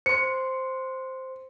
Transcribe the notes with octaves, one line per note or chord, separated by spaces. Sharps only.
C5 C6 C#7